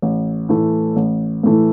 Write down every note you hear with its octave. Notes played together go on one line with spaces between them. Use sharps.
A1
A2 E3 A3
A1
A2 E3 A3